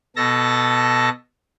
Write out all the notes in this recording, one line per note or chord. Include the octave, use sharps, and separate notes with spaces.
B2 A4 A5 A#6